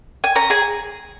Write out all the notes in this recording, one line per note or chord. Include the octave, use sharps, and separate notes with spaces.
G#5
C#4 A#5
G#4 G#5